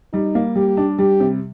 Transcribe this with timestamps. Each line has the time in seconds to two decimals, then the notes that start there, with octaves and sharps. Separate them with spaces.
0.13 G3 D#4
0.35 A#3
0.56 G3 G4
0.77 D4
0.99 G3 G4
1.20 C3